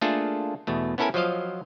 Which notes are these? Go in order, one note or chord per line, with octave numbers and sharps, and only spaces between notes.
A3 A#3 D4 F4 G#4 A4
E2 B2 A3
B3 C#4 E4 A4 A#4 G#5
F3 F#3 F4 C5 D#5 F5